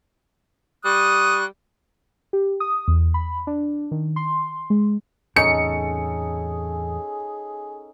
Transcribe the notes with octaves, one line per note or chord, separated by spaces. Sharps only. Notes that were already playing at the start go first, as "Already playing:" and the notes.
G3 C#6 D#6 F#6
G4
D#6
E2
B5
D4
D#3
C6
G#3
E2 A2 C3 C#4 D#4 G#4 A4 C#7